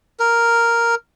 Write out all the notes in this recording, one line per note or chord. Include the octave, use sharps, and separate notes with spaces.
A#4